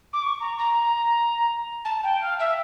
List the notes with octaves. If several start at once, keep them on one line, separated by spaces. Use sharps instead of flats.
D6
C#6
A#5
A#5
A5
G5
F5
E5